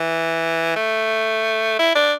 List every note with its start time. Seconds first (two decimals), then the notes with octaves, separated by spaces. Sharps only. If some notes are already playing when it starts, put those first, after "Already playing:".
Already playing: E3
0.76 A3
1.79 E4
1.95 D4